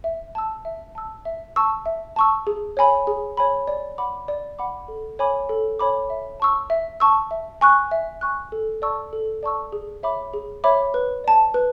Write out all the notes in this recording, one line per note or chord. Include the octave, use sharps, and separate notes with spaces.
E5
A5 E6
E5
A5 E6
E5
A5 C#6 E6
E5
A5 C#6 E6
G#4
C#5 G#5 B5
G#4
C#5 G#5 B5
D5
F#5 B5 D6
D5
F#5 B5 D6
A4
C#5 G#5 B5 D6
A4
C#5 G#5 B5 D6
E5
A5 C#6 E6
E5
A5 C#6 E6
E5
G#5 C#6 F#6
E5
G#5 C#6 F#6
A4
D5 A5 C#6 E6
A4
D5 A5 C#6 E6
G#4
C#5 E5 B5 D6
G#4
C#5 E5 B5 D6
B4
D5 A5
B4